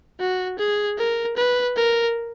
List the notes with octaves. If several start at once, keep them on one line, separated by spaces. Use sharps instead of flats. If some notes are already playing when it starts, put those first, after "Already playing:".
F#4
G#4
A#4
B4
A#4